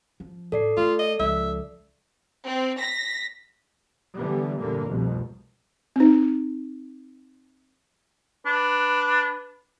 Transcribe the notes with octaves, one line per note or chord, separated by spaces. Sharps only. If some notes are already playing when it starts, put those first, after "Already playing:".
F3
A2 A4 D5 C7
A3 F4
D#5
C#2 F3 E5
C4
A#6 B6
D3 E3 G3 B3
E2 G2 A#2 D3 A#3
F1 C2 F2 B2
C4 D#4
D4 B4